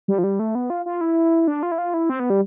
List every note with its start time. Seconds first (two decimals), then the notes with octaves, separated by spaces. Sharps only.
0.08 G3
0.18 F3
0.24 G3
0.39 A3
0.55 B3
0.70 F4
0.86 F4
1.01 E4
1.48 D4
1.63 F4
1.72 E4
1.78 F4
1.94 E4
2.10 C4
2.20 B3
2.30 G3